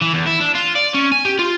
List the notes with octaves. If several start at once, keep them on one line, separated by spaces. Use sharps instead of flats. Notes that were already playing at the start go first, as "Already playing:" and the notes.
E3
E2
E4
D4
F4
D5
C#4
G#5
G4
F4